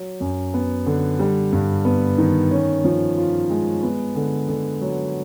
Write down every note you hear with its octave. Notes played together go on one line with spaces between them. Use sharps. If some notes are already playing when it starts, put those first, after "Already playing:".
Already playing: F#3
F#2
B3
D3
G3
G2
B3
D#3
C#4
F3
F4
G#3
B3
D3
D3
F#3